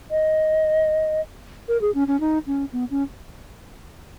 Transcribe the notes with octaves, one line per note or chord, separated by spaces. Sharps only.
D#5
A#4
G#4
C#4
C#4
D#4
C#4
B3
C#4